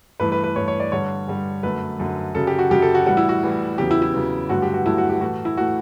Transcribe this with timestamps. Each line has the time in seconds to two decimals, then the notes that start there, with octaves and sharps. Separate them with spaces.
0.20 G2 E3 A3 B4
0.32 B4
0.44 B4
0.56 G2 E3 A3 C#5
0.68 C#5
0.80 D5
0.92 G2 D3 G3 C#5
1.28 G2 D3 G3
1.63 F#2 D3 A3 B4
2.00 F#2 D3 A3
2.34 F#2 C#3 F#3 A4
2.47 G4
2.59 F#4
2.70 F#2 C#3 F#3 G4
2.82 A4
2.95 F#4
3.06 A2 E3 G3 F#4
3.17 E4
3.29 F#4
3.43 A2 E3 G3
3.78 E2 C#3 F#3 G4
3.91 E4
4.02 E4
4.14 E2 C#3 F#3
4.49 G2 D3 F#3 A3 F#4
4.62 G4
4.74 F#4
4.86 G2 D3 F#3 A3 E4
4.98 F#4
5.10 G4
5.21 A2 E3 A3 F#4
5.45 E4
5.57 A2 E3 A3 F#4